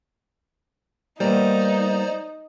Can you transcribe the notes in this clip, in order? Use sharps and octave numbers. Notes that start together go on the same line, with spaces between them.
G3 A#3 B3 D#4 C5 D5 A#5